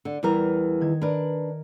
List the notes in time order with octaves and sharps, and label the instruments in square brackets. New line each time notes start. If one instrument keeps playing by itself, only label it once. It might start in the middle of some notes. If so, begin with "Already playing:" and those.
[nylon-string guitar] D3
[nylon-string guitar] E2 E3 A#4 [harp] G3
[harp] D#3 G#6
[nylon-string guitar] D4 B4 [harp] A#4 A#5